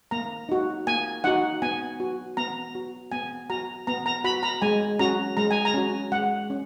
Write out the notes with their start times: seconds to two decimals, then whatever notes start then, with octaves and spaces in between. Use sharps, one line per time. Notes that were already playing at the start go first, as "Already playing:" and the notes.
0.11 A#3 A#5
0.49 D#4 F#4
0.87 A#3 G#5
1.24 D#4 F#4 F#5
1.62 B3 G#5
2.00 F#4
2.37 B3 A#5
2.75 F#4
3.12 B3 G#5
3.50 F#4 A#5
3.87 B3 A#5
4.06 A#5
4.24 F#4 B5
4.43 A#5
4.62 G#3 G#5
4.99 C#4 F#4 A#5
5.37 G#3 A#5
5.51 G#5
5.65 A#5
5.74 C#4 F#4
6.12 G#3 F#5
6.50 C#4